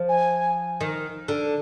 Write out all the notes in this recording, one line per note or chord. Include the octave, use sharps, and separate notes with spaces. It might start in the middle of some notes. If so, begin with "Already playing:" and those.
Already playing: F3
G#5
D#3
D3